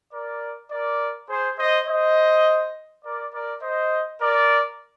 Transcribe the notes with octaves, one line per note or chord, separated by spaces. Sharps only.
A#4 D5
A#4 D5
G#4 C5
C5 D#5
C5 D#5
A#4 D5
A#4 D5
C5 D#5
A#4 D5